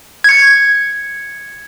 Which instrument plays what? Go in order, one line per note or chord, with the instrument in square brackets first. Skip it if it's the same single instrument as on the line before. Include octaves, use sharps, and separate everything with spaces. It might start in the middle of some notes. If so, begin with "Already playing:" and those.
[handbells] G#6 C#7